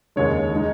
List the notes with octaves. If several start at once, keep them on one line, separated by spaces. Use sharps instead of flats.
D#2 C#3 G#3 C#5
G#3 D#4